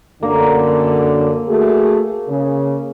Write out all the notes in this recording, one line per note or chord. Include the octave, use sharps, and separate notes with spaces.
F#2 D3 A#3
A3 F#4 G#4
C#3